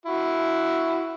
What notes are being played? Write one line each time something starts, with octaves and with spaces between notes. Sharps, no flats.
E4 F#4